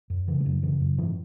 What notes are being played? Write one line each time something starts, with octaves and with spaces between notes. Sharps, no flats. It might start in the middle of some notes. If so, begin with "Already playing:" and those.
F#2
C#3 E3
G#3
F#2 F#3
C#3 E3
F#2
G#2 E3